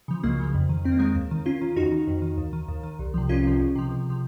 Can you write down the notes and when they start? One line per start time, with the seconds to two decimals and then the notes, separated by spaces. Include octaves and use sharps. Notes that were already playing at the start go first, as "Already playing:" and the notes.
0.08 C#3 F3
0.23 C#2 F#3 A#3
0.39 C#3 F3
0.55 F2
0.69 D#3
0.84 F2 C4
0.92 A#3
0.99 D#3 G#3 C4
1.15 D#2
1.31 D#3
1.46 D#2 C#4 F4
1.61 D#3
1.76 F2 D#4 F#4
1.92 D#3
2.07 F2
2.22 D#3
2.38 D#2
2.53 D#3
2.68 D#2
2.83 D#3
2.99 C2
3.14 C3 F3
3.29 C2 C#4 F4
3.45 C3 F3
3.60 C#2
3.75 C3 F3
3.91 C#2
4.06 C3 F3